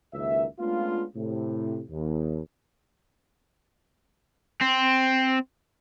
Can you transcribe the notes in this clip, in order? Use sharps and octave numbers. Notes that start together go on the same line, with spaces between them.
F#1 C#2 D#3 A#3 E5
G#3 A3 B3 C#4 D4 F4
A2 C3
D#2
C4